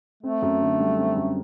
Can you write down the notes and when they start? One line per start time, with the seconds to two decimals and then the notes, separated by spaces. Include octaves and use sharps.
0.23 A3 C4
0.42 F#2
0.62 D3
0.80 G3
0.98 C4
1.17 F#2